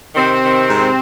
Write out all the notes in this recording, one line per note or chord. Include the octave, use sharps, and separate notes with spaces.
C3 D#3 C4
D#3
G#2